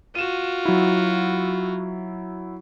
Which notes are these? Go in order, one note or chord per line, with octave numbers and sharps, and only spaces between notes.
F4 F#4 D#7 E7
F#3 E4